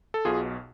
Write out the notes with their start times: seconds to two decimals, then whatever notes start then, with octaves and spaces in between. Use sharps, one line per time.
0.14 A4
0.25 B1 B2 F4 G#4